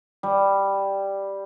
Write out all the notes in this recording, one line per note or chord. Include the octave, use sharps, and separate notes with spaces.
G3